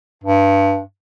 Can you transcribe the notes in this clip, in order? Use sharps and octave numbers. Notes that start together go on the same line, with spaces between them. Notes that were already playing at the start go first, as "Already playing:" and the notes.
G2